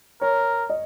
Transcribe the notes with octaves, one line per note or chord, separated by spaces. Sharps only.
A#4 C#5
D#5